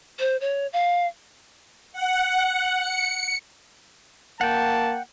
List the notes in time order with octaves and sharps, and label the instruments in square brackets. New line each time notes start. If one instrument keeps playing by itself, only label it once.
[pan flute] C5
C#5
F5
[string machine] F#5
C#7
[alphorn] A#3 [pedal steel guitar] F#5 G5 [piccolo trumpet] A5